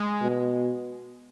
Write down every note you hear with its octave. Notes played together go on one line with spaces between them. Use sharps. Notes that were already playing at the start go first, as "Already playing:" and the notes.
Already playing: G#3
B2